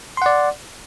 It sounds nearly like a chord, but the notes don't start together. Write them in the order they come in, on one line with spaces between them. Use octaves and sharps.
C6 F#5 D5